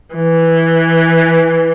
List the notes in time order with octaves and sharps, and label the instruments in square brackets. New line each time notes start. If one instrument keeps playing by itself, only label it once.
[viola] E3